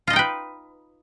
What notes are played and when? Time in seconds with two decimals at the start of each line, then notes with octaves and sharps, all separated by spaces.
0.07 F4
0.10 D#5
0.13 D#4
0.16 G5
0.19 B4